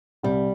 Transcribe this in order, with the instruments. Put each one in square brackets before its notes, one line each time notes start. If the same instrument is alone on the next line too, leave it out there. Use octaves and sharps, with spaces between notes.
[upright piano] C2 [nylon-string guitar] G3